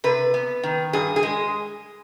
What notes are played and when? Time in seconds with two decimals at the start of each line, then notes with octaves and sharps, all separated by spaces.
0.04 C3 B4
0.34 B3
0.63 D#3
0.93 G2 G#4
1.16 G#4
1.23 G#3